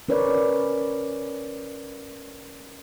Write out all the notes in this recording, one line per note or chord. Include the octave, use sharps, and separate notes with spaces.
C#4 A#4 B4 C#5 D5